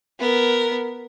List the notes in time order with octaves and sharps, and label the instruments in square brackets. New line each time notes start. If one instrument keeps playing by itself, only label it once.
[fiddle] B3 A#4